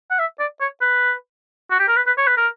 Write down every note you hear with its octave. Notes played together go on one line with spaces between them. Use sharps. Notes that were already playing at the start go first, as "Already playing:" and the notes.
F#5
E5
D5
C#5
B4
F#4
G4
A#4
B4
B4
C#5
B4
A#4